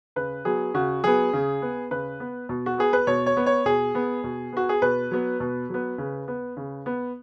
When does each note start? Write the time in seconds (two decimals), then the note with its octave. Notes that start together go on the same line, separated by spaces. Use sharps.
0.16 C#3 B4
0.45 F#3 B3 G#4
0.74 C#3 F#4
1.04 F#3 B3 G#4
1.33 C#3
1.62 B3
1.91 C#3 B4
2.20 B3
2.49 B2
2.66 F#4
2.78 B3 G#4
2.93 B4
3.07 B2 C#5
3.26 C#5
3.37 B3
3.46 C#5
3.66 B2 G#4
3.95 B3
4.24 B2
4.53 B3 F#4
4.69 G#4
4.82 B2 B4
5.11 F#3 B3
5.40 B2
5.69 F#3 B3
5.98 C#3
6.28 B3
6.57 C#3
6.86 B3